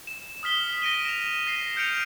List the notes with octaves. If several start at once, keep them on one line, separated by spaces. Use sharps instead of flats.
E7
D#6 F6 B6 G7
A#6 D7 D#7 G7
E7 F7
A#6 C7 D#7
F6 G6 C#7 D7 F7